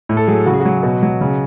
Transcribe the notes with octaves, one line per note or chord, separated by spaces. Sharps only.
A2
A4
F#3 G#4
C#3 F#4
G#4
F#4
F#3
B2
F#3
C#3